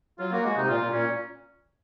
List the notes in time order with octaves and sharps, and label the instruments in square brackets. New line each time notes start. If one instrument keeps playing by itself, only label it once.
[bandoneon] F#3 [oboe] F4
[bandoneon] A#3 [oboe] F#4
[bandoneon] G#3 [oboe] F#4
[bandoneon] C3 [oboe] D#4
[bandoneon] A#2 [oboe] F4
[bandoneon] A#2
[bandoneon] A#2 [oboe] C#4